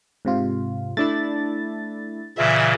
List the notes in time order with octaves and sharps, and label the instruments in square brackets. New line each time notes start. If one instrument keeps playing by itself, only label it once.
[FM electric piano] G#2 C3 F4
[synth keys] A3 D4 E4 [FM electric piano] A6
[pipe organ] A#2 C#3 E3 [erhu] E5